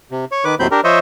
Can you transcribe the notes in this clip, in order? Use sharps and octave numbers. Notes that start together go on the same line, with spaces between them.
C3
C#5
D#3 B4 D6
D#2 A2 F#3 C4 B5 G6
D4 G4 A#4
F3 C5 C#5 D#5 E5